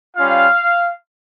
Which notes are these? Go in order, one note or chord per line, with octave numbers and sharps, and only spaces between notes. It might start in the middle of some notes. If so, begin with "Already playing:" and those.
G3 C#4 F4 F5